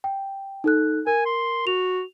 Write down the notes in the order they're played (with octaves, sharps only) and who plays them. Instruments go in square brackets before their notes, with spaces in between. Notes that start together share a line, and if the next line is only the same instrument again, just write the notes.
[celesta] G5
D#4 A4 F#6
[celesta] A#4 [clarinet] G#5
[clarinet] C6
[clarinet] F#4 [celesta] F7